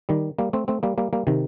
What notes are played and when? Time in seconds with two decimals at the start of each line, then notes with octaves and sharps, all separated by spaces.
0.09 D#3 G3
0.39 G3 A#3
0.53 A3 C4
0.68 A3 C4
0.83 G3 A#3
0.98 G3 A#3
1.13 G3 A#3
1.27 C3 D#3